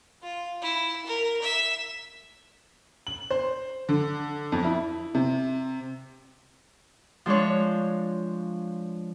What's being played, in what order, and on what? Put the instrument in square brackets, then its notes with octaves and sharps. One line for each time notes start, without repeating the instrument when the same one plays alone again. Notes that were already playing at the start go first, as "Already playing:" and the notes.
[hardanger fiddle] F4
E4
A#4
E5
[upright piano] F#7
C5
D3
F2
E4
C3
[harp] F3 G#3 D4 C#5